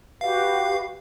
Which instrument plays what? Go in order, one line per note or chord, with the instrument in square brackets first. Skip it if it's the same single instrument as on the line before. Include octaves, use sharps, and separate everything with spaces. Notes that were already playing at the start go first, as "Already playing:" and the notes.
[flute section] F#4 G4 B4 [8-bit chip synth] F5